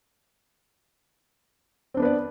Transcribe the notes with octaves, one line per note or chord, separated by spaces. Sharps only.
B3 C4 D4 B4 D5